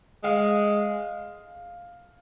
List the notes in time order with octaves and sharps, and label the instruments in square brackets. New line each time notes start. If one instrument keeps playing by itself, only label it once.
[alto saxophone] G#3 [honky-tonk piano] F5